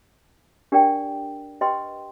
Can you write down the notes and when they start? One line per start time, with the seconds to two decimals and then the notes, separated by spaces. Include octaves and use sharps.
0.72 D4 G4 A#4 D5 G5
1.61 G4 B4 D#5 G5 C6